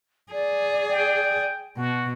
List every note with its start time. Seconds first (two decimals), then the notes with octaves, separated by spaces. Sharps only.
0.32 G#4 D5
0.90 G5
1.77 B2 F#4